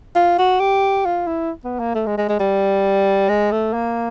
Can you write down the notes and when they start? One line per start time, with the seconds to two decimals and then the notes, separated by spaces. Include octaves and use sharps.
0.15 F4
0.38 F#4
0.60 G4
1.06 F4
1.27 E4
1.65 B3
1.80 A#3
1.95 A3
2.07 G#3
2.18 G#3
2.29 G#3
2.40 G3
3.29 G#3
3.52 A3
3.74 A#3